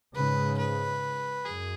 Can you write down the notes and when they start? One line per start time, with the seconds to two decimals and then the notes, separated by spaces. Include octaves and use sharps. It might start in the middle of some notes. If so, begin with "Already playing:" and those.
0.15 G#2 C#3 B4
0.58 B4
1.45 F#2 G#4